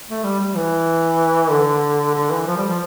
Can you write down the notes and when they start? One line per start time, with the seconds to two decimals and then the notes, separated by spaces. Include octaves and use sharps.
0.09 A3
0.24 G3
0.40 G3
0.56 E3
1.51 D3
2.15 D3
2.31 E3
2.47 F3
2.57 G3
2.67 F3